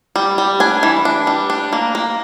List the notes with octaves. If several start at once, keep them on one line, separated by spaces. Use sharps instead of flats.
G3
G3
D4 G#5
E3
D4
G3
D4
A#3
A#3